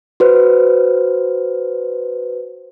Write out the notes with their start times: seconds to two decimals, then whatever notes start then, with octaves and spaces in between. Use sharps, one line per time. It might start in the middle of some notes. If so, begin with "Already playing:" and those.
0.20 F#4 B4 C5